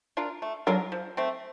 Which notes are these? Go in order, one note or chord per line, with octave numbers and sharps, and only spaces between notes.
D4 F4 A#4
A3
F#3 D4 F4 A#4
F3
A3 C4